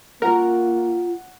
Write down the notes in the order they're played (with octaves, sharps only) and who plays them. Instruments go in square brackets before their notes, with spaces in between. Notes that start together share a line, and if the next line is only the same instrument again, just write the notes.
[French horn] A#3 [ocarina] F4 [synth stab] A#4 [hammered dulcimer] F#5 C#6